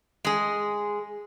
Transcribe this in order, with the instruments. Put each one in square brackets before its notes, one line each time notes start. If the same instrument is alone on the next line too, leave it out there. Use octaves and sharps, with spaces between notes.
[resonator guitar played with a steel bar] G#3 G#4